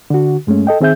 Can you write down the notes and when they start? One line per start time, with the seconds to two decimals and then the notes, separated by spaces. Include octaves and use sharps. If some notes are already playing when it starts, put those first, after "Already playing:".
0.10 D3 F#4
0.47 G2 G#3 A3 C#4
0.67 A4 D#5 G5
0.81 D#3 C4 G#4 E5 G6